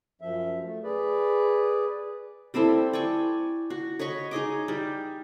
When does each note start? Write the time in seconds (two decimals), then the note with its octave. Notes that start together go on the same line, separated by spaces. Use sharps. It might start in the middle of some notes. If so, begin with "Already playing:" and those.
0.21 F#2 F3 E5
0.63 A3
0.83 G#4 B4 D5
2.54 G3 C4 E4 A4
2.93 D5 G5 G#5 C#6
3.70 F#4
3.99 C#5 D#5 B5 C#6
4.31 D#4 G#4 D#5 D6
4.68 G3